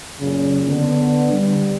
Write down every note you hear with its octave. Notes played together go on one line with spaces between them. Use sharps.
F#2 A#2 C#3
D3 B3
G3